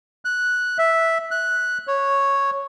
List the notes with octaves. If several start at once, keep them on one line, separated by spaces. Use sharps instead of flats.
F#6
E5
F#6
C#5